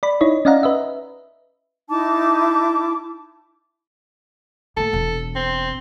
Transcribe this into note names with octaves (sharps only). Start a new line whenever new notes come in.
D5 B5
D#4 E4 C#5 D#5
C#4 D5 D#5 F5 F#5 A#5
B4 D#5 E5
D#4 E4 A5 D6
A2 A#3 A4
E1
C4